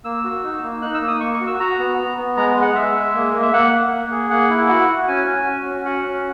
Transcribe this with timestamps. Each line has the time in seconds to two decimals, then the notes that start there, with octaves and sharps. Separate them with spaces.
0.04 A#3 E6
0.24 F#4
0.43 D#4
0.63 A#3
0.82 D#4 F#6
0.94 E6
1.02 A#3
1.08 D#6
1.20 A#3 C#6
1.34 C#6
1.40 F#4
1.47 E6
1.59 F#4 A#5
1.79 B3
1.98 B3
2.18 B3
2.37 G#3 A#5
2.56 G#3
2.62 F#5
2.75 G#3 E5
2.95 G#3
3.15 A#3
3.33 A#3
3.42 E5
3.53 A#3 F#5
3.73 A#3
3.91 A#3
4.11 G#4
4.30 A#3 F#5
4.50 E4
4.69 F#4 F#5
4.89 F#4
5.08 C#4 G#5
5.27 C#4
5.46 F#4
5.66 C#4
5.85 F#4 F#5
6.05 C#4